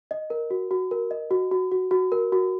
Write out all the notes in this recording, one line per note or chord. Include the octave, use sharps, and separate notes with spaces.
D#5
A#4
F#4
F#4
A#4
D#5
F#4
F#4
F#4
F#4
A#4
F#4